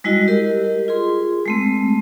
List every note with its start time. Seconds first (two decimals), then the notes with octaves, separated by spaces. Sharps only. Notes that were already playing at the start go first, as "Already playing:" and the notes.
0.04 G3 G#3 E4 F#4 D#5
0.28 G4 A#4 D#5
0.88 F4 G#4 C6
1.46 G#3 A3 C4